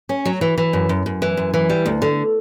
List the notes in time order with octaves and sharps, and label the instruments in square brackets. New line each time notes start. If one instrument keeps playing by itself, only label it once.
[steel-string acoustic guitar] C#4
F#3
E3
E3
F#2
F#2
F#2
E3
F#2
E3
G3
D2
D3